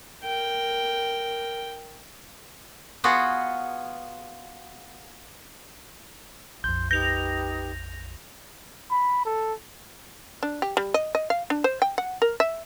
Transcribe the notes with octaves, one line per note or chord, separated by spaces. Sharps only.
A#4 G5
B3 F4 F#4 G#4
A#1 F2 C6 G6
D#4 G4 B4 G6 A#6 F7
B5
A4
D4
G4
G3
D#5
D#5
F5
D4
C5
G5
F#5
A#4
E5